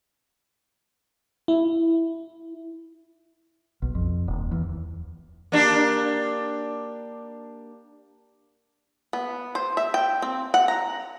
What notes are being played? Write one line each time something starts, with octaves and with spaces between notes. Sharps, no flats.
E4
B1
F2
D#1
E2
A#3 D4 G4
B3
C5
E5
G5
C4
F#5
A#5